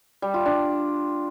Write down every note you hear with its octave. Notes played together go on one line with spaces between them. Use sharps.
G3
F4
D4